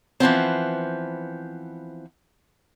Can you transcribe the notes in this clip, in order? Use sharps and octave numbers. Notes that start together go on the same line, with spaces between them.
E3 F3 B3 C4